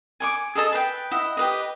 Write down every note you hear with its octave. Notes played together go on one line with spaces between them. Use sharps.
G#5 C#6 D6
G#4 A4 D#5 A5
B4 G5
E4 D#5 F#5
G4 B4 D#5